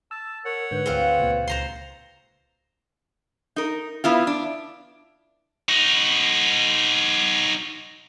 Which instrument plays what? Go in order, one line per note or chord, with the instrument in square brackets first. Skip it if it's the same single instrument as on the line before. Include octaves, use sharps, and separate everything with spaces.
[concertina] A5 [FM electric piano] E6
[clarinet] A#4 [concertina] C#5 F#5
[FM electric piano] G#2 D3 G6 [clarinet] B4
[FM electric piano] D2 G#4 [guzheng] C4 F4
[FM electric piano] C#2 A#2
[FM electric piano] C#2 [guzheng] C5 A#5 C6
[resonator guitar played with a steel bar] D#4 A#4
B3 E4 F4
D4
[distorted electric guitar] D#4 F#4